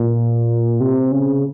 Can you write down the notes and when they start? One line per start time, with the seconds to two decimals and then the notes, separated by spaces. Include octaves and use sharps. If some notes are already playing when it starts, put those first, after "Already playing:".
Already playing: A#2
0.80 C3
1.12 C#3